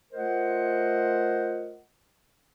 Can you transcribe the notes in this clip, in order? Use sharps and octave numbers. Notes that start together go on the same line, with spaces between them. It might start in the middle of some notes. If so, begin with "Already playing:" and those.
A3 F4 A#4 C5 D#5 F#5